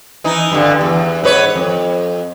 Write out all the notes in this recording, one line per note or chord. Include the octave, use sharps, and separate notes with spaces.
E3 D#4
G2 D3
E2
G#2 B4 C#5
F2